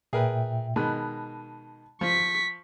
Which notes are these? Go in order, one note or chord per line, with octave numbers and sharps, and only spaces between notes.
A#2 G#4 A#4 B4 E5 G5
B2 D#3 G#3 A5 B5 F#6
F3 C#6 B6